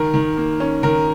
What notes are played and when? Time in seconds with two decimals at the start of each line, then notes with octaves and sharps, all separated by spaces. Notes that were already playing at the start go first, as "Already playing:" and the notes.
Already playing: D#3 A#4
0.14 D#3
0.37 A#3
0.60 C#4
0.83 D#3 A#4